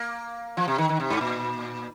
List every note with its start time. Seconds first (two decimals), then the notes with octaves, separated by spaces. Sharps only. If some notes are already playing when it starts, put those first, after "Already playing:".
Already playing: A#3
0.57 F3
0.68 C3
0.78 D#3
0.89 D#3
1.00 C3
1.10 G#2
1.21 A#2